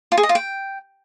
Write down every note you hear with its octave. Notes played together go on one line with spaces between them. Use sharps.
F4
G#4
D#5
F4
G5